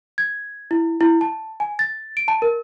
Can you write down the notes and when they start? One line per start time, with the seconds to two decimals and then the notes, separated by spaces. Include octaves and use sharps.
0.18 G#6
0.71 E4
1.01 E4
1.21 A5
1.60 G#5
1.79 A6
2.17 D7
2.28 A5
2.42 A#4